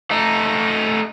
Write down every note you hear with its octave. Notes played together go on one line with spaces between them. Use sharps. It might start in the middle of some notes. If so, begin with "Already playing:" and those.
A3 D#4